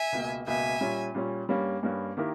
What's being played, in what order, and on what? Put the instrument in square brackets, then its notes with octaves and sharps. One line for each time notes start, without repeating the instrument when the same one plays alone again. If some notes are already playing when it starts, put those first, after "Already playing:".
Already playing: [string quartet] E5 G#5
[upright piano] C#2 B2 A#3
[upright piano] C#2 B2 A#3 [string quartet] E5 G#5
[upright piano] A#2 G3 C#4
A#2 G3 C#4
G2 G3 A#3 C#4
G2 G3 A#3 C#4
D#3 A#3 E4 G4 A#4